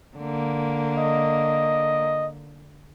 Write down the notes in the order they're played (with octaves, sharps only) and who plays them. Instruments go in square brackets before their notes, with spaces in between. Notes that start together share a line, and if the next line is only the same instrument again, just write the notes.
[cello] D3 A#3
[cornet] D#5